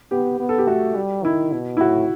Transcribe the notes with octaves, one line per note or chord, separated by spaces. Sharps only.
B3 G4
B3
A4
G4
A3 F#4
G3
D#3 E4
B2
E4
A2 F#4